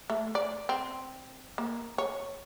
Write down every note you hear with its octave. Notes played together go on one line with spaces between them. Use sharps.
A3
D5
C4
A#3
C#5